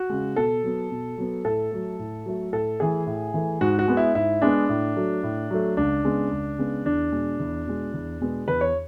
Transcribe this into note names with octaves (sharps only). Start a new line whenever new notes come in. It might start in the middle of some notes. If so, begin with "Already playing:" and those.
Already playing: F#4
C#3 G#3
B2 A4
F#3 B3
B2
F#3 B3
A2 A4
F#3 A3
A2
F#3 A3
A2 A4
E3 A3 G#4
A2
E3 A3
G#2 F#4
F#4
G#3 B3
E4
G#2 E4
G#3 B3 D4
A2
F#3 A3
A2
F#3 A3
C#2 D4
C#3 G#3 B3
C#2
C#3 G#3 B3
E2 D4
B2 G#3
E2
B2 G#3
E2
B2 G#3 B3
E2 B4
C#5